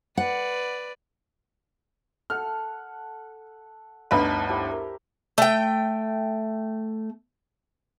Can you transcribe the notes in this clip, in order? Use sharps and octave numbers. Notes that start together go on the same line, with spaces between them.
B4 D5 F#5
A4 F#5 F6
G1 D2 D#4 B4 A5 B5
E4 G4 C5
A#4
A3 G5